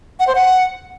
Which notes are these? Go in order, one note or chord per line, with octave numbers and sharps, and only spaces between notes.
F#5
C5
F#5